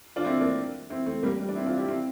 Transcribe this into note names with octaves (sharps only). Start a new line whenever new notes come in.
D4 F4
C4 E4
A#3 D4
C4 E4
A3 C4
G3 A#3
G3
D4
C4 E4
D4 F4
E4 G4
C4 E4